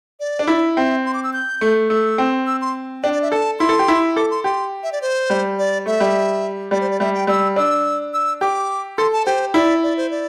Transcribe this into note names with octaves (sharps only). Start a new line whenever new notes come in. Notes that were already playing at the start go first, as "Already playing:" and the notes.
D5
D4
E4
C4 E5
C6
D6
E6
G6
A3
A3 E6
C4
E6
C6
D4 G5
D5
E5
A4 A5
E4 C6
A4
G4
E4
A4 D6
C6
G4 C6
E5
D5
C5
G3
D5
A3 E5
G3
G3 D5
C5
D5
G3 E5
G5
G3 E6
D4 E6
E6
G4 D6
A4 C6
A5
G4 C5
E4 D5
D5
C5
D5